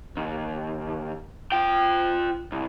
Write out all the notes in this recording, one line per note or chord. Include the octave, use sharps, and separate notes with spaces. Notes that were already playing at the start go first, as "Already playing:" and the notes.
D#2
F4 G5
C2